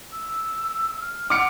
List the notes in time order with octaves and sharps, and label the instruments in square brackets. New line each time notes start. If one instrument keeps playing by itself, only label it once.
[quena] E6
F6
[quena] F#5 [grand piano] D6 F6 C#7